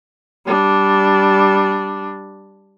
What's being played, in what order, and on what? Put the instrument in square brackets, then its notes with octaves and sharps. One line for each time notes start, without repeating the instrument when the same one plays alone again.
[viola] G3 D4